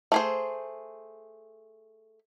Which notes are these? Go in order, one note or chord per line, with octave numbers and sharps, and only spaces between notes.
A3 G#4 C5